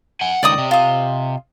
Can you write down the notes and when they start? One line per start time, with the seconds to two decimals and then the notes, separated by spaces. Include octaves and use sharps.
0.21 F#5 G#5
0.43 C#2 D#3 D5 D#5 D#6
0.58 C3
0.71 F4 D#5